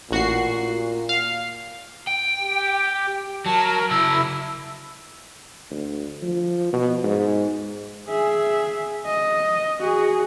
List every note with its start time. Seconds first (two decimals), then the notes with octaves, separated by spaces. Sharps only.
0.11 A1 A#2 F#4 C7
1.09 F5
2.07 G5
2.39 G4
3.46 F#3 A#4 A5
3.91 C#3 F#3 E4 A5 E6
5.71 D2
6.22 F3
6.73 B2
7.03 G#2
8.09 G#4 E5
9.06 D#5
9.80 F#4 G#4